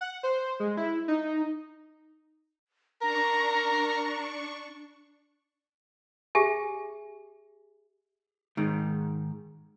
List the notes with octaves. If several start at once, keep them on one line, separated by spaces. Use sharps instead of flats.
F#5
C5
G#3
E4
D#4
D4 A#4 A#5 C#6
G4 G#4 E5 G#5
G#2 D#3